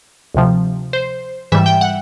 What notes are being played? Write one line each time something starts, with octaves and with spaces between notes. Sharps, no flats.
D2 C3 F3
C5
G#2 E3 G3 E5
G5
F#5